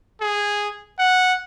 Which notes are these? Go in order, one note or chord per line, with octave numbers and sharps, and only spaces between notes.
G#4
F#5